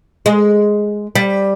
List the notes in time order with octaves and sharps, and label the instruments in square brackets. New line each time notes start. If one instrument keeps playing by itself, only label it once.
[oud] G#3
G3